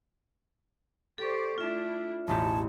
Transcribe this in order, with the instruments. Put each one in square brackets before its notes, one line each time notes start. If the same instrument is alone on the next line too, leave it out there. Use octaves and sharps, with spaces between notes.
[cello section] G4 C5 D5 [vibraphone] A4 C#6
[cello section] A3 D4 E4 [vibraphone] F4 E5
[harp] E1 A1 G4 [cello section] C#5 [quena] A5